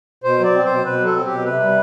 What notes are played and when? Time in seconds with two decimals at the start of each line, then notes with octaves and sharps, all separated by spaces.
0.24 B2 C5
0.39 F#3 D5
0.55 C4
0.65 C5
0.70 B2
0.85 B2 B4
1.00 F#3
1.05 A4
1.15 C4
1.25 B2 G4
1.45 C3 B4
1.60 G3